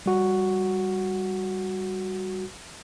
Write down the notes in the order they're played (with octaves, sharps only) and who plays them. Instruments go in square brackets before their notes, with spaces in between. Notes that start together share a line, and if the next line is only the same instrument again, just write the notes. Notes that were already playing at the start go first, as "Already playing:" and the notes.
[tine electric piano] G3 F#4